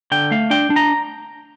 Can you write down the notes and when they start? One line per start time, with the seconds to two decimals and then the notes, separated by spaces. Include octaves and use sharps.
0.12 D3 G5
0.31 A3 F5
0.50 D4 G5
0.70 D4
0.76 A#5